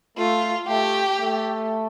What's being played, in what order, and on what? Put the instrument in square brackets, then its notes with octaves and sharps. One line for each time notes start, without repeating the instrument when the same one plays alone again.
[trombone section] A3 [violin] F4
[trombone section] A3 [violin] G4
[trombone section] A3